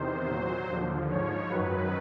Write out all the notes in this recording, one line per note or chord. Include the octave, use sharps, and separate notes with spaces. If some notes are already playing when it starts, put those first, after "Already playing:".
Already playing: E2 C3 D#3 C5
A#2 F#3
D#2 D3 F3
G#2 F3 C#5
F#2 D#3 F#3 B4